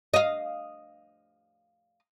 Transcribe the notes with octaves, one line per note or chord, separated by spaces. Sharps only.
D#5 F5